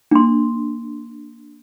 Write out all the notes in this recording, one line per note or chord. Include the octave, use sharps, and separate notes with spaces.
A#3 D4 C6